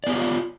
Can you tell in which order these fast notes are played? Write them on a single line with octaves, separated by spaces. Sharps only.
D5 B3 G4 C#5 F4